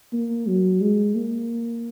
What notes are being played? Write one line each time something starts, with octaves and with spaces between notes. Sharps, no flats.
A#3
F#3
G#3
A#3